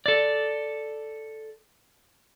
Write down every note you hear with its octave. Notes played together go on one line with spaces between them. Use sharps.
A4 D5